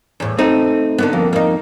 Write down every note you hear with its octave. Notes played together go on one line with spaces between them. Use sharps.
E2 A2
A3 C4 D#4
D3 A#3 B3
F2
A#3 D#4